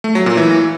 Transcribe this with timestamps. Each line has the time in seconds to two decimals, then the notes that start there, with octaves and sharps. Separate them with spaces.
0.04 A3
0.15 F#3
0.26 A#2
0.37 E3